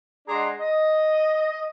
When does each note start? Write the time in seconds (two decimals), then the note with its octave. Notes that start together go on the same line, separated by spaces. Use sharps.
0.29 G#3 D4 G#4 F#5 A#5 C6
0.61 D#5